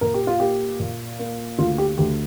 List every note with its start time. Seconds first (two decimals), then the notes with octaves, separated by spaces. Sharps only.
0.01 A#2 A#4
0.14 G4
0.27 F4
0.40 A#3 G4
0.80 A#2
1.19 A#3
1.59 D2 F4
1.78 G4
1.98 D2 G4